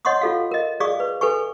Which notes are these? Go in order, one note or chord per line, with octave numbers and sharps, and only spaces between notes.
C#5 D#5 F#5 C6 C#6 D#6
F4 A4 F5
A#4 D#5
G#4 D5 F5 C#6 D#6
B4
A4 B4 G#5 C#6